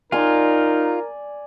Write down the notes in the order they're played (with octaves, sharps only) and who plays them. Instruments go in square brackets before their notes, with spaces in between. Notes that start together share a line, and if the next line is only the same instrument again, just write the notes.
[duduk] D#4 [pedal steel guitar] F4 [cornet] A#4 [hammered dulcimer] D5 G#5 C6